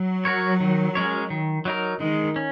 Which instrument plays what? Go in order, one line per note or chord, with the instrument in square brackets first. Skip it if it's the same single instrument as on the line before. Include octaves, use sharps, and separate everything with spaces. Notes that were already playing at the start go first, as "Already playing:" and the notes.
Already playing: [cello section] F#3
[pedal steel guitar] F#4 A#4 C#5
D#3
G#3 C#4 A#4 C#5
D#3
F#3 D#4 A#4
[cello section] D#3 [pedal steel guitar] G#3
[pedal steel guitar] C#4